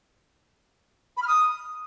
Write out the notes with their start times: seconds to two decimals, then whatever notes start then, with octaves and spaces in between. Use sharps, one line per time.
1.17 B5
1.22 F6
1.28 D#6